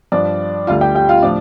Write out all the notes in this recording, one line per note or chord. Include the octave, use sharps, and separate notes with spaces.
G2 F3 D4 D5
D2 D3 G3 F4 F5
G4 G5
G4 G5
F4 F5
A2 F3 D4 D5